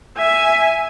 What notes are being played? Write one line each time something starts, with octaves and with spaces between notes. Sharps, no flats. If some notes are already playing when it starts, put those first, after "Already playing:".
E5 G#5